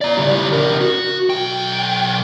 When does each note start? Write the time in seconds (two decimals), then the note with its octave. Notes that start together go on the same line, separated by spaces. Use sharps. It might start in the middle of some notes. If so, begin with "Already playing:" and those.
0.01 D5 A#5
0.17 C#3 G3
0.53 D4 A#4
0.81 F#4
1.30 B1 G5